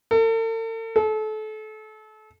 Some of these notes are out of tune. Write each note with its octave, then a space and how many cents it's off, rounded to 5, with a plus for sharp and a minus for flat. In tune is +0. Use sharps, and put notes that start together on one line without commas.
A4 +45
A4 -30